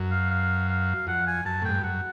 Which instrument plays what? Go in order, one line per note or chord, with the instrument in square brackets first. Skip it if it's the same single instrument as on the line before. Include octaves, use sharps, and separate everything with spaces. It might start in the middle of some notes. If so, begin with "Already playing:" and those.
Already playing: [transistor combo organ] F#2
[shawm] F5
F5
F5
[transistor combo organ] F2 [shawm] F#5
[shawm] G#5
[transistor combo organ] F#2 [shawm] A5
[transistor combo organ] A2
[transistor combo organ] G#2 [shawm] G5
[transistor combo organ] G2
[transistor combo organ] F#2 [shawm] F#5